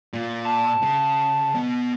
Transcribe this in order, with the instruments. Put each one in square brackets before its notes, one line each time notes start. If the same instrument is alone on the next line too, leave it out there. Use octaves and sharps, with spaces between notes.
[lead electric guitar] A#2
[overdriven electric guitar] A5
[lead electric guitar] C#3
B2